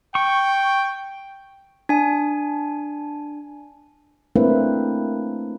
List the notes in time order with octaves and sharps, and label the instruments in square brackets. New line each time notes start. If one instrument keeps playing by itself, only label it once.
[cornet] G5 [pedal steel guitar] C#6
[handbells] D4 G#5
[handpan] A3 A#3 C4 D4 E4 B4